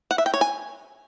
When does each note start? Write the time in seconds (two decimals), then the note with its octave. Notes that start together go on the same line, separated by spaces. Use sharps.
0.11 F#5
0.18 E5
0.26 G5
0.34 C#5
0.41 G#5